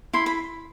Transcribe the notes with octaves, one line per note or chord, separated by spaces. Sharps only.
E4 C6
B5